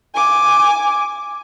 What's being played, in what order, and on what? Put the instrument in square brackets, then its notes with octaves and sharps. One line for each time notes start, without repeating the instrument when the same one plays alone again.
[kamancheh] G#5 D6